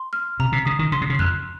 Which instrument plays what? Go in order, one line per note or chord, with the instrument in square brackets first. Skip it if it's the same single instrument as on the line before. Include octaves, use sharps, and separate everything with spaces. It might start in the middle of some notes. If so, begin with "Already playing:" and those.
Already playing: [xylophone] C6
F6
[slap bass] C3 [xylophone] A#5
[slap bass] C3
[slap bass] C#3 [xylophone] D#6
[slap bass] D#3
[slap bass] C#3 [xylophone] C6
[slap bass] C3
C#3
[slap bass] F2 [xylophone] F#6